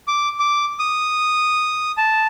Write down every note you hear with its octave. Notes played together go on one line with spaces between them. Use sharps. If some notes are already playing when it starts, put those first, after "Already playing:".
D6
D6
D#6
A5